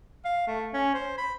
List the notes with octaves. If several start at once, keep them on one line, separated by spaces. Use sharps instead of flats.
F5
A3
C#4
C5
B5